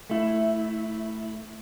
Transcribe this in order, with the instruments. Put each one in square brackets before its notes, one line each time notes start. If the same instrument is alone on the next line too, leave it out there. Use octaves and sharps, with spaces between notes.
[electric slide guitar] A3 E4